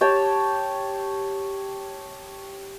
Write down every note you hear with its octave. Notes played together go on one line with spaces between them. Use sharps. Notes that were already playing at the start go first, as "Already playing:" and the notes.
G4 C#5 G5 A5